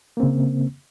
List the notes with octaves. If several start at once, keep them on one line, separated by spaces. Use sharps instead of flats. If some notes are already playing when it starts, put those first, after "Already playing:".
C#3 A#3 C4